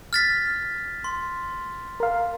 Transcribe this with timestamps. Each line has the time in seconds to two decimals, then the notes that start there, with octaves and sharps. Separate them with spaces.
0.13 F6 A6 B6
1.04 C6
2.00 A#4 F5